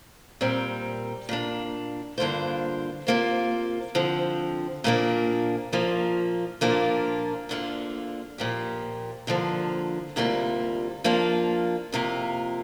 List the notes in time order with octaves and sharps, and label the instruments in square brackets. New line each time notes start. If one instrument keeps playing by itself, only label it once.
[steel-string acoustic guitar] A#2 G3 C4 A#4
A#2 A#3 D4
G2 D3 A#3 F4 C5
C3 A#3 F4 C5
D3 F3 C4
A#2 F3 A#3 D4
A#2 F3 A#3 F4
A#2 F3 A#3 D4 F4
D2 D3 A#3 F4
A#2 F3 A#3 G4
G2 D3 F3 A#3
D2 C3 G3 A#3 F4
F3 A#3 D4 F4
F2 C3 A#3 F4